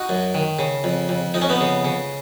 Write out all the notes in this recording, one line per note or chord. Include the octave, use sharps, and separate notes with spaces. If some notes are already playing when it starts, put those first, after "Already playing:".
Already playing: D#4 F#4
F#2
D#3
C#3
F2
F2
F2 D#4
C#4
B3 D#4
C#3
C#3